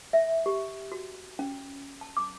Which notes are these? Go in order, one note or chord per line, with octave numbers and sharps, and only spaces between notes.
E5
G4
F#4
C#4
A5
D6